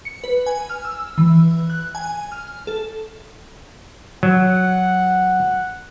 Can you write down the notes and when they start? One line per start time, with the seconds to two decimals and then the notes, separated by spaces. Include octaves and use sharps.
0.05 C#7
0.24 B4
0.46 G#5
0.70 F6
0.85 E6
1.18 E3
1.70 F#6
1.95 G#5
2.32 F6
2.67 A4
4.23 F#3 F#5